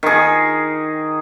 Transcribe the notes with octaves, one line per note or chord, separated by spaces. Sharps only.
D#3 G#4